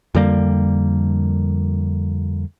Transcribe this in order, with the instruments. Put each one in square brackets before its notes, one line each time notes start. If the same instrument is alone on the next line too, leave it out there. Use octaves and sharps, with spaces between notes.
[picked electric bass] F2 D3 G3 A#3